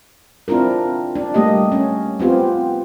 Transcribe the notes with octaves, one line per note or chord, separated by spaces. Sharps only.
C4 D4 E4 F4 A#4
D4
G3 A3 A#3 G4 D#5
C#4
B3 C4 F4 G4